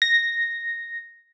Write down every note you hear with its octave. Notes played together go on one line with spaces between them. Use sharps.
A#6